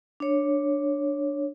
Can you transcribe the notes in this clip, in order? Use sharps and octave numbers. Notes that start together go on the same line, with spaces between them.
D4 C#5